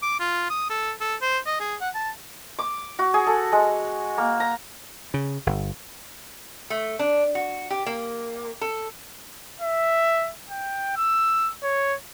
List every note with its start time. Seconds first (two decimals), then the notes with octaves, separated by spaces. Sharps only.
0.02 D6
0.20 F4
0.50 D#6
0.70 A4
1.01 A4
1.21 C5
1.46 D#5
1.60 G#4
1.81 F#5
1.95 A5
2.59 D6
2.99 F#4
3.14 G#4
3.27 A4
3.52 G#3
4.18 A#3
4.40 A#5
5.14 C#3
5.46 G1
6.70 A3
6.99 D4
7.35 F#4
7.70 G4
7.86 A#3
8.61 A4
9.61 E5
10.49 G5
10.97 E6
11.63 C#5